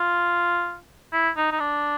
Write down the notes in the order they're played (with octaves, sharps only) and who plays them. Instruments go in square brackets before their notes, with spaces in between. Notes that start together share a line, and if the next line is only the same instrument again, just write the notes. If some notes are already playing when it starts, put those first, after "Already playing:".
Already playing: [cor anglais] F4
E4
D#4
D#4
D4